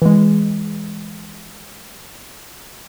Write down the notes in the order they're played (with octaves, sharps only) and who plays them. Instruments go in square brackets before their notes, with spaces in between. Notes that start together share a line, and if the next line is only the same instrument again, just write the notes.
[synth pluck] E3 G#3